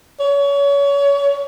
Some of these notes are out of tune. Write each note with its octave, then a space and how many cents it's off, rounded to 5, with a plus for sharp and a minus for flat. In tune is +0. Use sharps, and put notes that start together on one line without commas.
C#5 +30